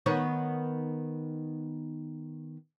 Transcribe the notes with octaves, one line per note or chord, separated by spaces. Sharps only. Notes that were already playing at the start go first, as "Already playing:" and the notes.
D#3 B3 C#5